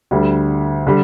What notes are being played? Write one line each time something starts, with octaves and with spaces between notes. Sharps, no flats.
D2 D3 G3
D3 G3